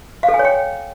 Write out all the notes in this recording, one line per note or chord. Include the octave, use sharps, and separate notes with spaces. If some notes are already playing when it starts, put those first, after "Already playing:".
F5
A4
G#5
C#5
G5